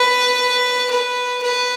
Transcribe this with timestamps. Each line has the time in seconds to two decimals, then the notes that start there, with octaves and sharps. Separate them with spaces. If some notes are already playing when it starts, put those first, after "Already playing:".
Already playing: B4
0.90 B4
1.42 B4